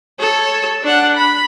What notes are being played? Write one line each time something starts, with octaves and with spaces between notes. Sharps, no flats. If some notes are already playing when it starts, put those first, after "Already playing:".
A4 C#5
D4 F#5
B5